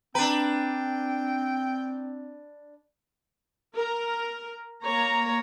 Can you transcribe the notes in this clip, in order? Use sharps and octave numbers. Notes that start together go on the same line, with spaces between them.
C4 D4 B4 G5 A#5
A#4
A#3 C#5 A#5